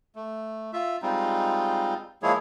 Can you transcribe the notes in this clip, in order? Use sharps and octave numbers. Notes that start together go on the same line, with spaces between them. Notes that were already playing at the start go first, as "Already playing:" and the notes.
A3
F4 E5
G3 G#3 C4 D#4 F4
F3 G#3 A#3 E4 G#4 C#5